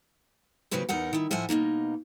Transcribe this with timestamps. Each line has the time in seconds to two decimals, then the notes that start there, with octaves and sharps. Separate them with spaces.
0.71 C#3 F3 F#3 A#3 C4 B4
0.89 E2 D#4 A#4 F#5
1.13 D#3 E4
1.31 A2 F3 E5 F#5 G#5
1.49 B2 E3 A#3 D#4